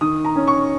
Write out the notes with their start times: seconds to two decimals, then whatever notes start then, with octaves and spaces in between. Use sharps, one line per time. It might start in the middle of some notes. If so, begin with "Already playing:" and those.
0.01 D#3 D#6
0.25 A#5
0.36 C#4
0.47 C#6